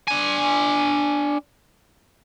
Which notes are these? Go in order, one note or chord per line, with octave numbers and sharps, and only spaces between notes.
D4 G#5